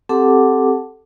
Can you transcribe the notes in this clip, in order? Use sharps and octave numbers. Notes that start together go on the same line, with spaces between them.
C4 G4 A4 F#5 A5 D6